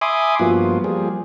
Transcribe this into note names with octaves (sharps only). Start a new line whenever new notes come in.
E5 G#5 B5 C6 D6 D#6
G2 F3 A#3 B3 F4 F#4
F3 G3 A#3 G#4